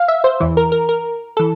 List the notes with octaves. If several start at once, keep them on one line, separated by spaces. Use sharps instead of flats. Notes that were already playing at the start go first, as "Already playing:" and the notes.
Already playing: F5
E5
C5
E2 E3
A#4
A#4
A#4
E3 A4